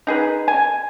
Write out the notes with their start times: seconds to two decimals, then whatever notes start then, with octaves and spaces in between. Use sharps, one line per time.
0.07 D#4 G#4 B4
0.48 G#5